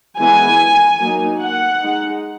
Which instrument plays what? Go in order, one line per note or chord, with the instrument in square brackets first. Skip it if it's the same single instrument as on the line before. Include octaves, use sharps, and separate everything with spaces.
[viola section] E3 G#3 B3 E4 G#5
F#3 A#3 D#4
F#5
G#3 D#4